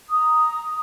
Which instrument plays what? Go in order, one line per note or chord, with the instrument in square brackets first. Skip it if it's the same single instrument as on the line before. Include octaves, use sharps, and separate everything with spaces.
[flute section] A#5 D#6